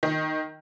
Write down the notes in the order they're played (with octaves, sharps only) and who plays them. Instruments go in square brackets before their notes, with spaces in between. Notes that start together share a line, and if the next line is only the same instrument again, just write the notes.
[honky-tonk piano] D#3